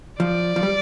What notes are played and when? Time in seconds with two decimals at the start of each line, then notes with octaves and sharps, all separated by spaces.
0.20 F3 D5
0.56 F3
0.63 G3